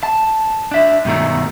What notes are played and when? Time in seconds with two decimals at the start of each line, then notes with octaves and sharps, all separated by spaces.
0.03 A5
0.71 D4 E5
1.05 G2 B2 D#3 E3 F#3 A3